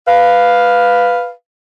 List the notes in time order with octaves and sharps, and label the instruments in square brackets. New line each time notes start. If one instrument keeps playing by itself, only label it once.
[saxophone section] B4 F5